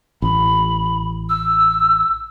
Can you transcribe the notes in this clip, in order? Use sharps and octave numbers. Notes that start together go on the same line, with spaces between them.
A1 B5
E6